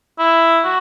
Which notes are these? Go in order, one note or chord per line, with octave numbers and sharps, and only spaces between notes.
E4
F#4